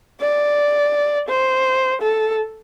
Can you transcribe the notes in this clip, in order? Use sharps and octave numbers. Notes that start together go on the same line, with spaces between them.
D5
C5
A4